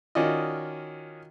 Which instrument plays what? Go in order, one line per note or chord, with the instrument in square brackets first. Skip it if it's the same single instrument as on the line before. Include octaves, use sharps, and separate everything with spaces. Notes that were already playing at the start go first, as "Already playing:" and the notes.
[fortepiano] D#3 C#4 F4 F#4 D5 D#5